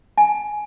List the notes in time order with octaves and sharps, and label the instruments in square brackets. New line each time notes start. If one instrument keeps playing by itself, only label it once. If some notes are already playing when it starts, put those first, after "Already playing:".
[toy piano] G#5